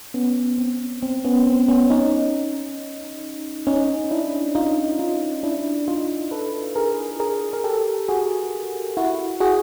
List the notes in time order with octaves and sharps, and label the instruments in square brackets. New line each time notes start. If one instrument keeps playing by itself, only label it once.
[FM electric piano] B3 C#4
C4
C4
B3 C#4
C4
B3 C#4
C#4 D#4
C#4 D#4
D4 E4
D#4 F4
D#4 F4
D4 E4
D#4 F4
A4 B4
G#4 A#4
G#4 A#4
A#4
G4 A4
F#4 G#4
E4 F#4
F#4 G#4